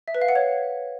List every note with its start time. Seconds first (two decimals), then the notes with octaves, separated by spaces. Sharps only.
0.08 E5
0.15 B4
0.22 F5
0.29 F#5
0.35 C#5